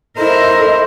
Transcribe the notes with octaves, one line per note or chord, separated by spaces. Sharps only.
E4 A4 A#4 C5 D#5